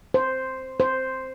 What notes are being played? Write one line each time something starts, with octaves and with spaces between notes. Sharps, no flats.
C5
C5